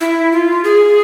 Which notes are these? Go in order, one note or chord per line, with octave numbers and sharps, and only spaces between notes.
E4
F4
G#4